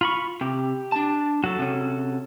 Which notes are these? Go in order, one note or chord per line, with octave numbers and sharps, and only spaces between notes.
F4 B5 C#6
C3 G4
D4 A5
F#3 F#4 A4
C3 C#4